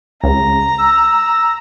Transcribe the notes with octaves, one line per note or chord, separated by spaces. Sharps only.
C#2 A#5
E6